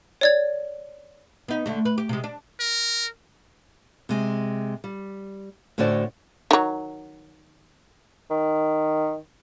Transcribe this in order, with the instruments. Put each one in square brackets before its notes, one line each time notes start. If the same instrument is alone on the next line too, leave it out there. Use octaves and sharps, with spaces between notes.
[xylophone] C#5 D5 G#6
[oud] B3 D#4
D3 A3
B4
G4
C3 G#3
D4
[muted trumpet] A#4
[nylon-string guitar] C3 G#3
G3
A2 D3 C#4 F#4 C5 D5
[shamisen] D#3 F#3
[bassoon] D#3